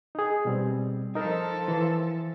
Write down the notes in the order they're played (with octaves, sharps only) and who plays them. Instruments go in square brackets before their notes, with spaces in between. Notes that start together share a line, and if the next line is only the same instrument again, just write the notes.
[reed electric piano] D#4 G#4
B2 G3 C4
[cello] F3 A4 [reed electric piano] D#4 A#4
[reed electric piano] E3